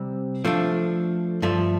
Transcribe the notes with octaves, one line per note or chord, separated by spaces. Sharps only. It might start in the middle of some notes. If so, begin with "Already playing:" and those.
Already playing: C3 G3 C4
F3 A3 D4
G2 F3 A3